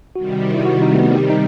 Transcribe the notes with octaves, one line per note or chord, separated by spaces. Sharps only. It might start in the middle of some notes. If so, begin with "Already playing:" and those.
C3 D#3 G3 F#4
E4
F#4
D#4
A3
B3
D#4